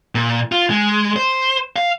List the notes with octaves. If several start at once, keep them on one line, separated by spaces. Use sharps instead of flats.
A#2
F4
G#3
C5
F5